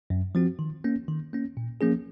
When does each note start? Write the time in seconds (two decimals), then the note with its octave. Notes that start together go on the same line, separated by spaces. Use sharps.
0.10 F#2
0.35 F3 C4 F#4
0.59 D#3
0.84 A#3 C#4
1.08 D#3
1.33 A#3 C#4
1.57 A#2
1.81 F3 A#3 C#4 G#4